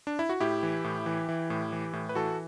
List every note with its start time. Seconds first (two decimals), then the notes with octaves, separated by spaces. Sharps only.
0.07 D4
0.19 E4
0.29 F#4
0.40 A2 E4 G4
0.63 E3
0.84 A2
1.06 E3
1.29 E3
1.50 A2
1.72 E3
1.93 A2
2.09 B4
2.15 E3 F#4 A4